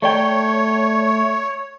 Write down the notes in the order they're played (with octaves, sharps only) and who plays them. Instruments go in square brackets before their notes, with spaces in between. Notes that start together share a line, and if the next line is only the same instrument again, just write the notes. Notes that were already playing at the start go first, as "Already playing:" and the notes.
[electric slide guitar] A3 D5 G5 [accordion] C#5